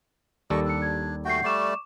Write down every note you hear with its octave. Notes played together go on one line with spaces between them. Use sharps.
D#2 G3 A4 A#4 D5 D#5 C#6
D4 E6 C#7
G#6
A3 F#4 F#5 G5 G6 C7
G3 A3 D5 C#6 D6 E7